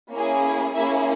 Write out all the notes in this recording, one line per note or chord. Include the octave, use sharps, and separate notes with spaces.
A#3 C#4 E4 G#4
A#3 C#4 E4 G#4 E5